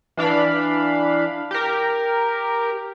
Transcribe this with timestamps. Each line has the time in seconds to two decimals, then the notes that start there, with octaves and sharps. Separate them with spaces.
0.17 E3 D4 F5 B5
1.51 G4 A#4